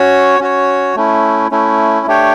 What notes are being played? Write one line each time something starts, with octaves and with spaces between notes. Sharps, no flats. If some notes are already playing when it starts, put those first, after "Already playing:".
Already playing: C#4 F#4 C#5
C#4 F#4 C#5
A3 C#4 E4
A3 C#4 E4
A3 D4 G4 C#5 G5